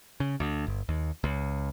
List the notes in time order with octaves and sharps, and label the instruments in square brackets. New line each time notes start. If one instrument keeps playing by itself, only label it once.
[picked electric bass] C#3
D2
G1
D#2
C#2